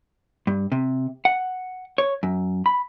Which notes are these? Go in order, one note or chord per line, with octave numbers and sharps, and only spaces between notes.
G2
C3
F#5
C#5
F#2
B5